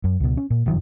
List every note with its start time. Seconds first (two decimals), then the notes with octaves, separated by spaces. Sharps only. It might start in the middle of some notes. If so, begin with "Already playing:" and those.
0.04 F#2
0.20 C#2 B2
0.37 C#4
0.50 A#2
0.66 F1 F#2 D#3 F3